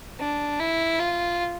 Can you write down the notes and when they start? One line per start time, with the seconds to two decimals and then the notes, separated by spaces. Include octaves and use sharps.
0.19 D4
0.60 E4
1.00 F4